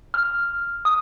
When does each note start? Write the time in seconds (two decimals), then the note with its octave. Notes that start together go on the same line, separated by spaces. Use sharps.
0.14 F6
0.85 D#6